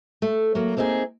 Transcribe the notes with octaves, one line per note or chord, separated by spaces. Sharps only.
A3
F#3 A#3
A#3 C4 D#4 E4 G#4